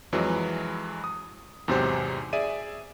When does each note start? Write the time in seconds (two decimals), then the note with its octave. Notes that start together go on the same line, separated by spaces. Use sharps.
0.12 F2 E3 F#3 G#3
1.04 D#6
1.68 E2 G#2 C3 F#3 G4 C5
2.33 G#4 D5 E5 D#7